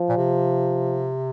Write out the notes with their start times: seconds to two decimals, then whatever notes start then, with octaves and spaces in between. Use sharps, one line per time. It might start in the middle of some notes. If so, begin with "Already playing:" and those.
Already playing: F3
0.09 A#2
0.17 C3